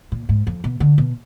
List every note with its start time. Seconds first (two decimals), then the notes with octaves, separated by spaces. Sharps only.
0.12 A#2
0.29 G#2
0.47 F2
0.64 B2
0.80 D3
0.98 B2